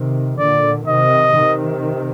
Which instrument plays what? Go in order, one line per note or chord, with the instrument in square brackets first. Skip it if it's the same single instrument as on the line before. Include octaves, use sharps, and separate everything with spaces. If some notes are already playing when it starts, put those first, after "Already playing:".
Already playing: [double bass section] C3 D#3
[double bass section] A#2 D3 [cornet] D5
[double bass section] C3 D#3 [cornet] D#5
[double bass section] C3 D#3